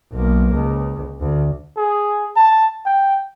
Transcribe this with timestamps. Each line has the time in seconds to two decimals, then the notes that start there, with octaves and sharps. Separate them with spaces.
0.12 B1 A#3
0.53 C#2
1.20 D2
1.77 G#4
2.37 A5
2.86 G5